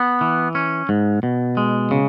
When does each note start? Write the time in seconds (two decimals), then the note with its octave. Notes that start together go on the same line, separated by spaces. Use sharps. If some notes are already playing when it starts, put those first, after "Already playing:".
Already playing: B3
0.21 E3
0.55 C#4
0.89 G#2
1.23 B2
1.57 G#3
1.91 C#3